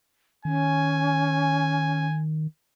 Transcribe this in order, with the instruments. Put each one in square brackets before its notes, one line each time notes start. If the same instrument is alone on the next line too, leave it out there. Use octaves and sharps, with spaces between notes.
[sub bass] D#3 [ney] C#4 [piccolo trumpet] G#5